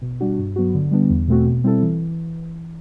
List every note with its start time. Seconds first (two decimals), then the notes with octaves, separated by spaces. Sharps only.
0.02 B2
0.20 G3 D4 F#4
0.38 G2
0.56 F#3 B3 F#4
0.74 D3
0.91 G3 B3 D4
1.10 E2
1.28 B2 A3 C4 F#4
1.45 B2
1.64 G3 C4 E4 A4
1.82 E3